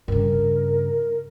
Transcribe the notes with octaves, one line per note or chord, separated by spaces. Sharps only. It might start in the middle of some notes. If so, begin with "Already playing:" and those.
G2 C#3 A#4